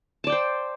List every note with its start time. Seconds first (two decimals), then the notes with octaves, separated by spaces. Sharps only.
0.24 A5
0.27 D5
0.30 G5
0.32 C5